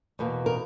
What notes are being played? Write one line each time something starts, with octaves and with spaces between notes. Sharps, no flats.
E2 B2 A#3
A#4